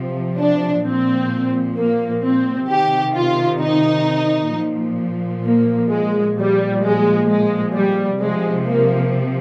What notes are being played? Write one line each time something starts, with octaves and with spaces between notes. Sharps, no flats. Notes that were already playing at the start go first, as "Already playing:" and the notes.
Already playing: C3 F3
D4
A#2 F3 C4
A#3
C4
C3 D#3 G4
F4
D#4
A#2 F3
A#3
G#3
A#2 F3 G3
G#3
G#3
G3
C3 F3 G#3
A#3